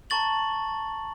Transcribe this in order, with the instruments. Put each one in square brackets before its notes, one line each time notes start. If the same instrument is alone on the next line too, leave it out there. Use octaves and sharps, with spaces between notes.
[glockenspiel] A5 A#5 C#6 A6 F#7